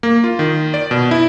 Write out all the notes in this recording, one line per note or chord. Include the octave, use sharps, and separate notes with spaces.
A#3
F4
D#3
D5
B2
E4